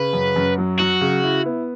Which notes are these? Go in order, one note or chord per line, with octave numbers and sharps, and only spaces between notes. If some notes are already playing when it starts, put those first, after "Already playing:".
Already playing: C#3 B4
F#2
F#2
F#3
F#3 F#4
C#3
E4
B3